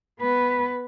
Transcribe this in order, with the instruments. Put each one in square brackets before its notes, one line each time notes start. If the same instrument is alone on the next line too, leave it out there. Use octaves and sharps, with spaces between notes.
[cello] B3 B4